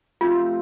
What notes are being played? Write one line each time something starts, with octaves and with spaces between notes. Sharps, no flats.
C3 F3 A3 C4 F4